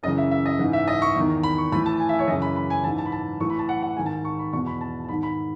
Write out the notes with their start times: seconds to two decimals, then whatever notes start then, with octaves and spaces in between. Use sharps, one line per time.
0.03 F#2 C#3 E3 D#5
0.18 E5
0.31 E5
0.46 D#5
0.59 G#2 E3
0.73 E5
0.88 D#5
1.02 C#6
1.16 E2 D#3
1.43 B5
1.58 C#6
1.72 A2 B5
1.76 E3
1.86 A5
2.00 G#5
2.09 E5
2.19 C#5
2.28 F#2 C#3 E3 D#5
2.42 B5
2.56 B5
2.70 G#5
2.84 G#2 E3 A5
2.98 A5
3.06 B5
3.12 A5
3.40 A2 E3 C#6
3.50 B5
3.59 A5
3.69 F#5
3.82 F#5
3.96 G#2 D#3 G#5
4.06 A5
4.25 C#6
4.39 B5
4.53 E2 B2 C#6
4.67 B5
4.81 A5
5.04 A5
5.09 G#2 D#3 B5
5.23 B5